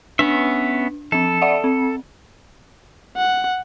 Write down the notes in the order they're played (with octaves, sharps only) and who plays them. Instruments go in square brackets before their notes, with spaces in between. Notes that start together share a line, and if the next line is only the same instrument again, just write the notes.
[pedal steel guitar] B3 C#4 E5 [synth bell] D4
[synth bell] F3 C4 [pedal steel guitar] A4
[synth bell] D5 E5 F#5
C4
[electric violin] F#5